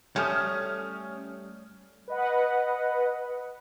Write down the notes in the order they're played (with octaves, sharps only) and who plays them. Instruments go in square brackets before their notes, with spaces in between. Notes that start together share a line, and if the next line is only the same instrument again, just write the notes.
[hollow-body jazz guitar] G3 A3 [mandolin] C#4 [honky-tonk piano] D#6 F6 G6
[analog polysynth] B4 D#5 F#5